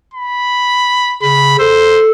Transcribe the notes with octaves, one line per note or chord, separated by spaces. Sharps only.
B5
C#3 B5
A4 C5